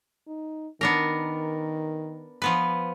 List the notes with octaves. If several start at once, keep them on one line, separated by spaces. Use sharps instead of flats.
D#4
D#3 B3 D4 A#4
F3 B3 B4